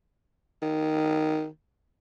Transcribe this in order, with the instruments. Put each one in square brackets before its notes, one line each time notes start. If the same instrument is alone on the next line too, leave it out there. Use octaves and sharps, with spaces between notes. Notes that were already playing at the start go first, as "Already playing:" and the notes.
[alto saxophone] D#3